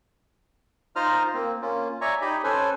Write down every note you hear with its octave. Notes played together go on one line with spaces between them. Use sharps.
D#4 F4 C5 D#5 A#5 F6
A#3 C4
A#3 C#4 F4
C#5 D5 E5 G#5 A#5 C#6
D#4 G4 D#5 B5
C#4 A4 B4 C5 G#5